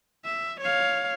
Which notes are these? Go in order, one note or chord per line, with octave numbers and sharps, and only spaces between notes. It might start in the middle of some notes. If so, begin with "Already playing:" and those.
E5
C#5 F5